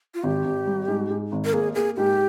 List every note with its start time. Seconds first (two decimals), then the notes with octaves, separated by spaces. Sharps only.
0.14 F4
0.23 G#1 G4
0.45 G#1
0.67 G3
0.88 G#2
1.10 G#2
1.32 G#1
1.45 A#4
1.53 A#3 G#4
1.75 A#3 G#4
1.97 G#2 G4